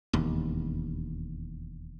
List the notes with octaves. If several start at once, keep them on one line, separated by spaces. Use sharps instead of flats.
E1 D#2